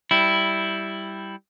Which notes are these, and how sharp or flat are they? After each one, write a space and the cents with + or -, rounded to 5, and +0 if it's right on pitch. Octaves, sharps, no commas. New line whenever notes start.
G3 +0 E4 +0